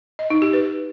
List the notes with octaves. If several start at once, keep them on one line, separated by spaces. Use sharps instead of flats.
D#5
D#4
G4
B4